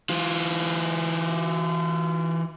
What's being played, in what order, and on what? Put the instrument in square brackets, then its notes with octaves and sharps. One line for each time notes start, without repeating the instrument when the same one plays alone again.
[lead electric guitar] E3 F4